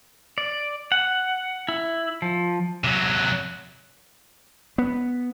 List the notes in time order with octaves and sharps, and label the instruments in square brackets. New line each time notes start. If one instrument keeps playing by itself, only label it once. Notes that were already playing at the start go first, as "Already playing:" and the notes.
[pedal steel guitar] D5
F#5
E4
F3
[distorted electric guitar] C3 F#3
[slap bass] B3